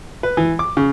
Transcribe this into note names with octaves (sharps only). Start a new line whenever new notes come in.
B4
E3
D6
C#3